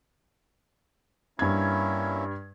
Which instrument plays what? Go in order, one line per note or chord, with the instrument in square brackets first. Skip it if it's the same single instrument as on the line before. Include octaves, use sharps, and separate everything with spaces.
[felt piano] G2 G#6 [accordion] A#3 C#4 E4